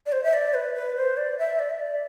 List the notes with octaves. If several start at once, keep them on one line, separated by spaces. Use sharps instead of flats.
D5
C5
E5
D5
B4
B4
C5
D5
E5
D5
E5
D5